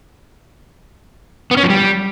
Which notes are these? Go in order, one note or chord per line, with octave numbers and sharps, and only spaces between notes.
B3
C#4
F3
G3